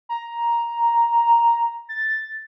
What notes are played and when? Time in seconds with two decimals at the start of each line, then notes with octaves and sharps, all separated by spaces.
0.09 A#5
1.89 A6